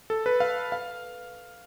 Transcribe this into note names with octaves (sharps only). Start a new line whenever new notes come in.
A4
B4
F5
F5